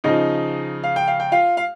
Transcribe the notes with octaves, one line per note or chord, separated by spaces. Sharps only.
C#3 F3 D#4 D#5
F5
G5
F5
G5
F4 F5
F5